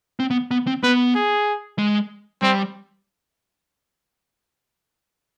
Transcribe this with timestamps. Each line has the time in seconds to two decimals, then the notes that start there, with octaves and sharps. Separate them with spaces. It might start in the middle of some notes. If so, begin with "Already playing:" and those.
0.20 C4
0.30 B3
0.51 B3
0.67 C4
0.83 B3 B4
1.15 G#4
1.78 G#3
2.42 G3 C4